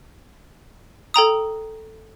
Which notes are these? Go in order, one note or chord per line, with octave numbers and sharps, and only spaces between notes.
A4 G5 A#5 D#6